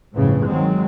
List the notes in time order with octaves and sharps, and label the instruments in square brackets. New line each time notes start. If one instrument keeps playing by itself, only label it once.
[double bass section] G1 F2 A2 C#3 E3
D#3 F#3 G#3 C4